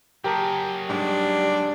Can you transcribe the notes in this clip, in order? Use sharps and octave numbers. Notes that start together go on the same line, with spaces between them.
F#3 G4 G#4 A#4 A5
G#2 G3 D4